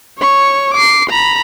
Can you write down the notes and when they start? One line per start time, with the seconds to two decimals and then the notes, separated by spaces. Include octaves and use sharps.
0.18 C#5 C#6
0.74 D6 C7
1.10 A#5 B5